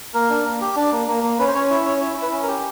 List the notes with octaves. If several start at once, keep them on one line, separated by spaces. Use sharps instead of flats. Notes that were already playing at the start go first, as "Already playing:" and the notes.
A#3 A#4
D4
A#3
G4
D4
A#3
A#3
A#3
C#4 B4
C5
C#4 C#5
E4 C#5
C#4 C#5
E4 C#5
E4
B4
C#4
A#4
G4